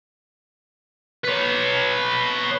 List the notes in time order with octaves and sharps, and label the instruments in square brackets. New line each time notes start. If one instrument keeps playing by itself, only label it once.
[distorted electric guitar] B4 C#5